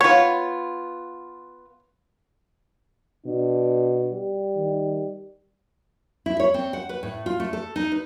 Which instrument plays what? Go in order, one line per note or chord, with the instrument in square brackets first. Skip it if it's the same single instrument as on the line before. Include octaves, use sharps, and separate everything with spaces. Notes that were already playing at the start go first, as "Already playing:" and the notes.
[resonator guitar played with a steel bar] B3 F4 [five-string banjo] C#5
[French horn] B2 [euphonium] D4
[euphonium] G3
[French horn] D#3
[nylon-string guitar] E4
C#5
C4
F#5
B4
A2
F4
A3
A4
D#4
B4